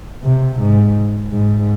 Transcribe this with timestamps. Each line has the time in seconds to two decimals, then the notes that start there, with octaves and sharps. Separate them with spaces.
0.23 C3
0.59 G#2
1.32 G#2